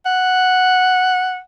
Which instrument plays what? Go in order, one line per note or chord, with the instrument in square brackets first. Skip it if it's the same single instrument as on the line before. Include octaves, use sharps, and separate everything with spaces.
[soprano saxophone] F#5